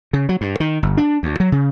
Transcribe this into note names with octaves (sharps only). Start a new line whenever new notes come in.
C#3
F#3
G2
D#3
G1
D4
D2
F#3
C#3